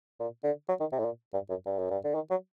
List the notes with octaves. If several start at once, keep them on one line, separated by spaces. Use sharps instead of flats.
A#2
D3
F#3
D#3
C3
A2
A#2
G2
F#2
G2
F#2
G2
D3
D#3
F#3